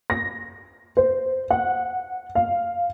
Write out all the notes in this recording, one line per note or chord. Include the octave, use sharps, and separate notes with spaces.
A#6
C5
F#5
F5